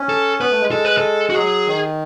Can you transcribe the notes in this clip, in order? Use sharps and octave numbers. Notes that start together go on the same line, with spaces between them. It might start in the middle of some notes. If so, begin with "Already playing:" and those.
Already playing: C#4
A4
B3 B4
A3
G#3
G#3 A4
B4
A4
F#4
F#3 G#4
D#3